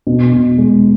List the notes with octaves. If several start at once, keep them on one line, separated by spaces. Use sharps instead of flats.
B2
B2
G#3